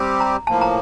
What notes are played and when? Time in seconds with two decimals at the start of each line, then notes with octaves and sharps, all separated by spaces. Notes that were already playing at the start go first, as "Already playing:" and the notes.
Already playing: G3 C4 G4
0.20 A#5
0.47 A2 F3 A#3 A5
0.61 A#5